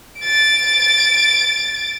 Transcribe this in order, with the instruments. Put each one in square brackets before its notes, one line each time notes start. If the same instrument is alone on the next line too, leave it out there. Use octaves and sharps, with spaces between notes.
[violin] A6 D7